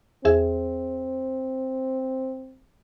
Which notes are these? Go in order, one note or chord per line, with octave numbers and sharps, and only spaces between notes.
E2 C4 G#4 E5